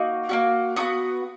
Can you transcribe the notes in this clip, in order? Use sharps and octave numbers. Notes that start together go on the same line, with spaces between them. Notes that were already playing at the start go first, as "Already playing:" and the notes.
Already playing: A#3 D#4 F#4 C#6
A#3 C#4 F#4
B3 D#4 F#4 D#6